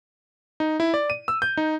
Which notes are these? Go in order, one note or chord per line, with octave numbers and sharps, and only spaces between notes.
D#4
E4
D5
D#7
E6
G6
D#4